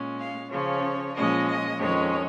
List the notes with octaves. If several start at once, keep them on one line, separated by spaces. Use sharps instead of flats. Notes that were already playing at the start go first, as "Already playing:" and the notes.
Already playing: A#2 G#3 C#4
F5
C#3 F3 C#4 C#5
A#2 F3 G#3 C#4 D#5
D#5
F2 D#3 G#3 C#4 C#5